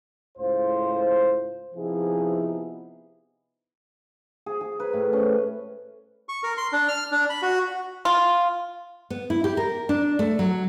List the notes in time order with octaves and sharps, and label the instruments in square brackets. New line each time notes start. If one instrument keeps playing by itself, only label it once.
[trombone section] C#2 A2 F4 C5
C3 F3 B3 D#4 E4 G#4
[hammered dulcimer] G#4
G#4
B4
A2
C#4
[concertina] C#6
A#4
C6
D4
F6
D4
B5
F#4
[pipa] F4
[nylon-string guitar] B3
E4
G4
A#4
D4
A3
F#3